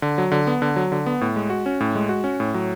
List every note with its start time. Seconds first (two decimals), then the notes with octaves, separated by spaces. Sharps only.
0.02 D3
0.18 F#3
0.32 D3
0.47 B3
0.62 D3
0.76 F#3
0.92 D3
1.06 B3
1.21 A2
1.36 G#3
1.50 F#4
1.66 C#4
1.80 A2
1.95 G#3
2.09 F#4
2.24 C#4
2.40 A2
2.54 F#3